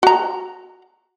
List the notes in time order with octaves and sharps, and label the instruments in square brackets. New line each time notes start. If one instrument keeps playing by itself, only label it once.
[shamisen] F#4 A#5